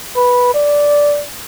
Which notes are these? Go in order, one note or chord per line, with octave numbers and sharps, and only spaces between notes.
B4
D5